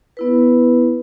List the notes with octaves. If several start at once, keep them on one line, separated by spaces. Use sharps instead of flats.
B3 E4 B4